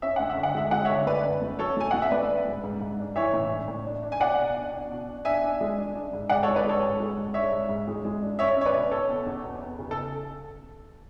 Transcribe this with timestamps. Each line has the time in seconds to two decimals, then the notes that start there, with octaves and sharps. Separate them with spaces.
0.02 C#4 E5
0.16 D2 F#5
0.29 E5
0.37 D3
0.43 F#5
0.55 G#3 E5
0.71 G#3 F#5
0.85 C#5 E5
0.90 D3
1.06 A3 B4 D5
1.24 F#2
1.42 A3
1.59 F#3 A4 C#5
1.77 A3 G#5
1.91 A3 F#5
2.02 E5
2.11 A3 B4 D5
2.29 D4
2.47 G#2
2.64 G#2
2.81 G#2
2.99 D4
3.16 E3 C#5 E5
3.33 A2
3.50 D4
3.68 A2
3.86 D4
4.03 D4
4.12 G#5
4.20 B2 D5 F#5
4.38 B2
4.56 D4
4.73 D4
4.90 B2
5.08 D4
5.25 D4 E5 G#5
5.43 D4
5.61 G#3
5.78 D4
5.95 D4
6.13 G#2
6.29 G#2 D5 F#5
6.43 A4 C#5
6.48 G#3
6.56 B4 D5
6.64 G#3 A4 C#5
6.83 G#2
7.00 G#3
7.17 G#2
7.34 D4 C#5 E5
7.52 G#2
7.69 G#2
7.88 G#3
8.05 G#3
8.23 D4
8.39 C#4 C#5 E5
8.56 C#4 C#5
8.65 B4 D5
8.75 B2
8.91 C#4 A4 C#5
9.09 B2
9.26 E2
9.44 B3
9.62 B3
9.79 C#3
9.91 A4